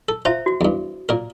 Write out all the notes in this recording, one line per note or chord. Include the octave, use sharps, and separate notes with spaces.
A4
F4 C5 E5 A#5
F#4
E2 G2
A#2 A#4